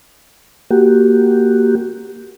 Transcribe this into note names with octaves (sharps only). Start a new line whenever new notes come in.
A#3 F#4 G4